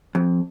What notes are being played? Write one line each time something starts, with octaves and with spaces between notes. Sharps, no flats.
F2